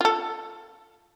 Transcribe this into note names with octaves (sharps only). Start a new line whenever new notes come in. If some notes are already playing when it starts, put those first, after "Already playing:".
F4 A4